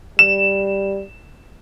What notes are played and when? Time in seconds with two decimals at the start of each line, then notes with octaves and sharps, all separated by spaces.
0.19 G3 E7